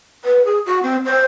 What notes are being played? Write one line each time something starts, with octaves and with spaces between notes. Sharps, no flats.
B4
G#4
F#4
C4
C5